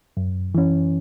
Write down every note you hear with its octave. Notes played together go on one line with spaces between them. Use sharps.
F#2
E3 C#4